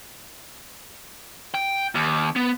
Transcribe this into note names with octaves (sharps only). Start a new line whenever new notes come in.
G5
D#2
B3